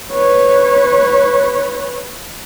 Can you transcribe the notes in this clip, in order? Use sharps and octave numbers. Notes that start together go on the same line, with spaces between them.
B4 C#5